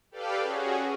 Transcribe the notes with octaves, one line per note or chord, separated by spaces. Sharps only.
G4 A4 B4 D5 F5 G5
C#4 F#4 G#4